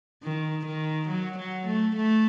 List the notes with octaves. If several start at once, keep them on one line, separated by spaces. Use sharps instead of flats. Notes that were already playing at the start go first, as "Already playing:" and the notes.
D#3
D#3
F#3
F#3
A3
A3